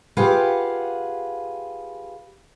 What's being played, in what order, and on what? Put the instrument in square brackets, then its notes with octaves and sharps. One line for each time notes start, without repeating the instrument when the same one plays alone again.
[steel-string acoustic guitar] F4 G4 G#4 B4 F5 F#5